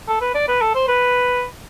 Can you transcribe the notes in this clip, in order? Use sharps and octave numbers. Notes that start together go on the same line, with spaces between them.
A4
B4
D5
B4
A4
C5
B4